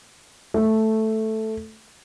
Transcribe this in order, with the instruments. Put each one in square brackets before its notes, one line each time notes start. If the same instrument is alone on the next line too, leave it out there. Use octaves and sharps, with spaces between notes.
[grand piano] A3